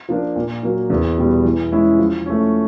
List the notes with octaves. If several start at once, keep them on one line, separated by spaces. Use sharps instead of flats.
F3 A#3 D4
A#2
F#3 A#3
E2
B2 G3
E3
G#3 C#4 E4
F3
A3 C#4